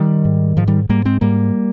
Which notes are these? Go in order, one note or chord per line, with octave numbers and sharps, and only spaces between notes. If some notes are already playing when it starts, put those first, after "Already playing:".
Already playing: D#3 G3
G#2
G#2 F3
D#3 G3
G#2 G3 A#3
G#3 C4
G#2 G3 A#3